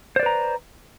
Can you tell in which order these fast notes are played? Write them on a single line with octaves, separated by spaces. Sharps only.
C5 D5 B4 A#5